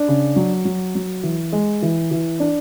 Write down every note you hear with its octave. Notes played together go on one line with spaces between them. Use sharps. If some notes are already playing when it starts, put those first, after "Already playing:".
Already playing: D4
C#3
F#3
F#3
F#3
E3
G#3
E3
E3
D4